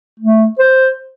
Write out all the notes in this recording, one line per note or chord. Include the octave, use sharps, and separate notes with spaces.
A3
C5